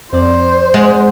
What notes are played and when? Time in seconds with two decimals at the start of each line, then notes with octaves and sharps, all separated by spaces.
0.13 F2 C4 C5 D5
0.74 G#3 F#5